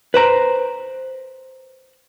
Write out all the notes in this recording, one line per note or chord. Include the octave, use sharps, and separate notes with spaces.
B4 C5 A#5